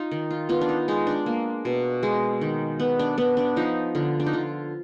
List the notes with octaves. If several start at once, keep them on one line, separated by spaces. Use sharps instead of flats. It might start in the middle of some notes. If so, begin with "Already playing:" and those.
Already playing: D#4 F4
D#3
F4
B3 F4
D4
D#4
G#3 D#4
D4
A#3
B2
G#3
D#3
B3
D4
B3 D4
D4
F3 D#4
D3 F4
D4
D#4
D3 F4